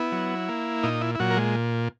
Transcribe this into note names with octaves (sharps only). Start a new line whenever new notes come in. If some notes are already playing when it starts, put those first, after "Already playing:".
Already playing: B3 E4
F#3
A#3
A#2 D#4
E4
E4
A#2 F#3 F#4
A#4
G#3